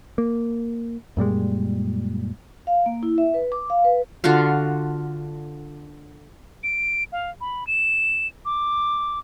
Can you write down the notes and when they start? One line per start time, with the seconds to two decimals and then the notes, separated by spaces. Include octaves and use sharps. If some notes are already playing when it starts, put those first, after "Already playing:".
0.18 A#3
1.17 F#2 A#2 G3 G#3
2.67 F5
2.86 A#3
3.03 E4
3.18 E5
3.34 B4
3.52 D6
3.70 F5
3.85 B4
4.24 D3 F4 F#4 F5
6.63 D7
7.12 F5
7.41 B5
7.67 E7
8.45 D6